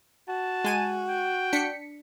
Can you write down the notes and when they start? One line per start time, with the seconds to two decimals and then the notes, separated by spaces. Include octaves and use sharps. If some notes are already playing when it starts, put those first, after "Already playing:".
0.29 F#4 A5
0.64 G#3 G#5 D#7
1.09 G5
1.53 D4 B6 C#7